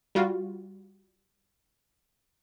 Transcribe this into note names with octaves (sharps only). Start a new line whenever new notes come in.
G3 F4 F#4